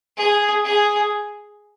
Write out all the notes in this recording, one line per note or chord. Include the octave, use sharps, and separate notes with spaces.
G#4
G#4